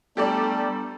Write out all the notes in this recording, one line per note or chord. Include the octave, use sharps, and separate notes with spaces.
G3 A3 B3 D4 G4 A4 D5 A#5